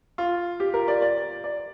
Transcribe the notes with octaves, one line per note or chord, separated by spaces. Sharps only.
F4
G4
A#4
D5
D5
D5